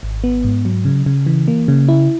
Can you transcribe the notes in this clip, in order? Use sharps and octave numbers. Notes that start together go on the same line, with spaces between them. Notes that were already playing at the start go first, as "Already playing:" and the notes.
G#1
B3
G#2
F#3
C#3
C#3
E3
A#3
C#3
E4